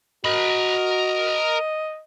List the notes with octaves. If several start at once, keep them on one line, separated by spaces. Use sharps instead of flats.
F#4 A#4 D#5 B5